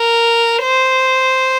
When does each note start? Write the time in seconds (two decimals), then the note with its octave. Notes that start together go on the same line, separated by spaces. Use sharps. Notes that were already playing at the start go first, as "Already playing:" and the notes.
Already playing: A#4
0.63 C5